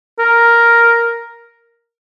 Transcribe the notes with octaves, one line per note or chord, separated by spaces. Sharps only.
A#4